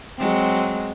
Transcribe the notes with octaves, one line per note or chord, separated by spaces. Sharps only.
F#3 G#3 C4